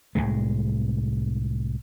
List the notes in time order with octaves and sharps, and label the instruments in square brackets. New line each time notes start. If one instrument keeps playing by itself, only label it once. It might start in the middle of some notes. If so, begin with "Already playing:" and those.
[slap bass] C2 F#2 A2 G#3